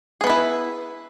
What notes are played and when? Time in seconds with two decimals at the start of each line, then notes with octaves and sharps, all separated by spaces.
0.21 G#4
0.24 B3
0.27 B4
0.30 E4